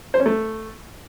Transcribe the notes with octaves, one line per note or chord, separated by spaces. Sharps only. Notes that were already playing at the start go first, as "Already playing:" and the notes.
C5
C#4
A3